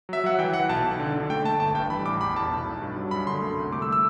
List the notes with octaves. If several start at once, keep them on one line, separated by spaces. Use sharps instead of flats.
F#3 E5
F#3 F#5
E3 G5
E3 F#5
B1 A5
B1
D3
D3
A3 G5
A3 A5
G1 A5
G2 G5
E3 B5
A1 D6
E2 B5
E2 A5
B1
B1
G2
F#3
F#2 B5
D3 C6
A3
C2
A3 D6
E6
A3
E6